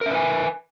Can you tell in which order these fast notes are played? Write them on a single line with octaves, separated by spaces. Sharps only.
A#4 E5 B4 G#5